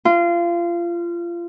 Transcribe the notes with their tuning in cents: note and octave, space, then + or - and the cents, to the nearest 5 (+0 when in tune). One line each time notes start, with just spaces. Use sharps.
F4 -25